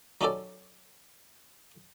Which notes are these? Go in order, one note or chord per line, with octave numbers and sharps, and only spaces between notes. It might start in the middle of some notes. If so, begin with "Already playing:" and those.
F#3 C#4 D#4 G4 A4 D5